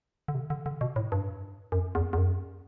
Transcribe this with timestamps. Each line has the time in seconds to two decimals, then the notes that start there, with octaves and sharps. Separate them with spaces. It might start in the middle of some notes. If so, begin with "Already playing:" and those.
0.28 D3
0.35 C3
0.50 D3
0.66 D3
0.81 B2
0.96 A2
1.12 G2
1.72 F#2
1.95 E2
2.13 E2
2.18 F#2